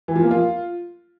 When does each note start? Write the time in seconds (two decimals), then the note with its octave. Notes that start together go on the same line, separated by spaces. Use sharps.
0.08 E3
0.16 F3
0.23 A#3
0.31 F4